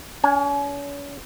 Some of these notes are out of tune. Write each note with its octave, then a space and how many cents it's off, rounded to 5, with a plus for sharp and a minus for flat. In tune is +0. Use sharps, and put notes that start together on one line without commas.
C#4 +40 G#5 +0